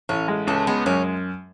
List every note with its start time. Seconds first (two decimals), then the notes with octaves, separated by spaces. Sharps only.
0.09 A1 C#4
0.28 G#3
0.47 C#2 A3
0.67 G#3 B3
0.86 F#2 C#4